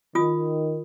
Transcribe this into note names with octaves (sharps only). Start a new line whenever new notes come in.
D#3 F4 D#6